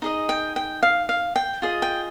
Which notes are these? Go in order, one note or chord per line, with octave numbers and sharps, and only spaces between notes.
D#4 G#4 D#5
G5
G5
F5
F5
G5
F4 G#4 D#5
G5